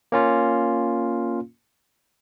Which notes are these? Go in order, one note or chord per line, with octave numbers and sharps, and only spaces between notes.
A#3 C#4 F4